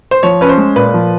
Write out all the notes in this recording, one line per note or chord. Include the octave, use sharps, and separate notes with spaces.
C5
F3 C#5
C#4 B4
C5
G#3
A#2 B4
F3